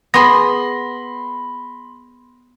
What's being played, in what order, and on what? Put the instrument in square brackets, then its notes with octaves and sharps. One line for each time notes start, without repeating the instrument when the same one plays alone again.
[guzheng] B3 G#4 [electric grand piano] B5 C6 A#6